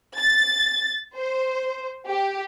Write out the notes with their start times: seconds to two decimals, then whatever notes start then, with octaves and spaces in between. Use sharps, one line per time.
0.17 A6
1.15 C5
2.08 G4